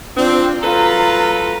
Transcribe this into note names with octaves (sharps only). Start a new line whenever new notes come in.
C4 D4 F4
F#3 F4 A4 B4 A#5